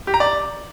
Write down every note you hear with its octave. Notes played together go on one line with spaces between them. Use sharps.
G4
A#5
D5